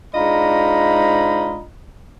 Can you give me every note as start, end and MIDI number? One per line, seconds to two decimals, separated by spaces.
0.15 1.64 44
0.15 1.64 62
0.15 1.64 65
0.15 1.64 75
0.15 1.64 82
0.15 1.64 83